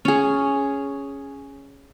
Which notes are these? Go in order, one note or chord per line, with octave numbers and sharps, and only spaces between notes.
C#4 G#4